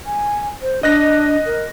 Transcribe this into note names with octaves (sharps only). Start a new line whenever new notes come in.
G#5
C5
D4 D#5 F#6 A#6
A#4